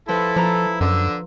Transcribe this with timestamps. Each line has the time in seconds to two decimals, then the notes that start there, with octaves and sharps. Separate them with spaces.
0.08 F3 E4 A4 B4
0.36 F3 B4 A#5
0.81 F#2 D3 E6